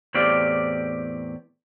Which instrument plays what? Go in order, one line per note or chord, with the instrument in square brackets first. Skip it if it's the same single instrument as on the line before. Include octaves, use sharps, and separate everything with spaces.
[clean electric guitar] E2 A2 C4 G4 D5 F5